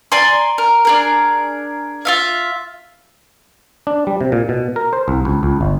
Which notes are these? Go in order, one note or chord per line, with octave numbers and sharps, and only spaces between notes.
D5 G#5 A#5 C6
A#4
D4 G#4 A#4
F4 E5 F5
D4
G3
C3
A#2
B2
A#4
C5
C2
C#2
C#2
G1